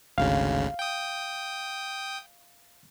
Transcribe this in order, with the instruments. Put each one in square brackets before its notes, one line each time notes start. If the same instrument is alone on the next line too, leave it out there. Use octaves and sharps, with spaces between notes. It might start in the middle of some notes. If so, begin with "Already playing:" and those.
[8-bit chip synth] G#1 D2 C#3 [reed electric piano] F5
[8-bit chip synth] G5 D#6